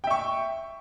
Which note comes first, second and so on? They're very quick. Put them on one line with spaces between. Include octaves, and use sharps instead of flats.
G5 E5 C#6